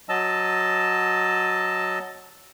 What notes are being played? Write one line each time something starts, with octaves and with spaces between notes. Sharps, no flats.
F#3 D#5 A5 E6